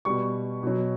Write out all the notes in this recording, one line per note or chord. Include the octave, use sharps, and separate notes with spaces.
B2 G3 C#6
B2 F#3